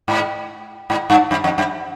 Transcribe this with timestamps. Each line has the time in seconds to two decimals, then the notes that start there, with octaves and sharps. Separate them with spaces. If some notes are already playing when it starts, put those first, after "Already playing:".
0.08 G#2
0.90 G#2
1.10 G2
1.31 F#2
1.44 F2
1.58 F#2